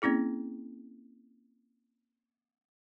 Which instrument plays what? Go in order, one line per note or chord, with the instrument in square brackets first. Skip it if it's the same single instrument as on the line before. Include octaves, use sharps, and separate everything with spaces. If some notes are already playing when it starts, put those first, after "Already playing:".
[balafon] A#3 C4 C#4 E4 G#4